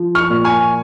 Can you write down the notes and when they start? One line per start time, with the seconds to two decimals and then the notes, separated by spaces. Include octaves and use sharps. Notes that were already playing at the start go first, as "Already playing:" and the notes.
Already playing: F3
0.15 C#6 F6
0.30 A#2
0.44 G#5 C#6